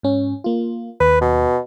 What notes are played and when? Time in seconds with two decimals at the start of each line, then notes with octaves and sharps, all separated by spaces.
0.03 G#2 C#4
0.44 A#3 F4
1.00 D#2 B4
1.21 B2